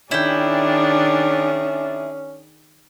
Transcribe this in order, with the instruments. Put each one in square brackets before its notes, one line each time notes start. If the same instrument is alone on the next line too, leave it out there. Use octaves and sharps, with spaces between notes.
[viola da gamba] D#3 G#4 [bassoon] C#4 [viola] D4 [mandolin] E4 G5